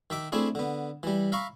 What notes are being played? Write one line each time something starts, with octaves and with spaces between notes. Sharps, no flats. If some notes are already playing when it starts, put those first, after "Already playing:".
D#3 E5 D6
A3 C4 D4 E4 G#4
D3 B3
E3 G3
E5 F5 A#5 B5 C#6